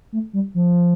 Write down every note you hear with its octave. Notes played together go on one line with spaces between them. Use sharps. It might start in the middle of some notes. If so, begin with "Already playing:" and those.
A3
G3
F3